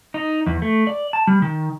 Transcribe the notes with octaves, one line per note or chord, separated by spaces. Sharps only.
D#4
E2
A3
D5
A5
G3
D#3